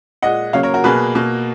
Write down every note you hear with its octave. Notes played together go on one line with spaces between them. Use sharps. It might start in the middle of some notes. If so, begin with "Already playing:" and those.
A#2 G#3 D#5 F#5
C#3 F#3 A#3 C#5 F5
A#4 C#5
F#4 A#4
B2 A#3 G#4 B4
B2 A#3